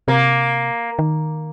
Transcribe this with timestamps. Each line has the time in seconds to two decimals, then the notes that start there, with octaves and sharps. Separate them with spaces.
0.08 C3 A#3
0.99 D#3